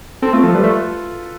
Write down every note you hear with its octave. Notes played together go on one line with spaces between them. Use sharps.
C4 A4
A3 F4
F3 A4
G3 B4
A3